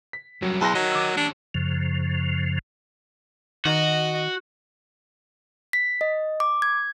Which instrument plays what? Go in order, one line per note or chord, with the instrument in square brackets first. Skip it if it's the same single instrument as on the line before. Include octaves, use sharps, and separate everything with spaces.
[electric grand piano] B6
[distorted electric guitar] F#2 G3 [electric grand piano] F#3
[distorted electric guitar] B1 C6 [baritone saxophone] E2 [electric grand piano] A5 F#6 A#6
[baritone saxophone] F#3 [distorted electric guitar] A#4 D#5
[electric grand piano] D6 E6
[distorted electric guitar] C#4 G4 [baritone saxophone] D4
[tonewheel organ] F#2 C#3 F3
[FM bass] D#3 [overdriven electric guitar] F#4 [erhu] D#5
[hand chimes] B6
D#5
D6
G#6